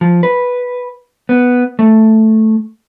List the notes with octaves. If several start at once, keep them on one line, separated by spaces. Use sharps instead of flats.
F3
B4
B3
A3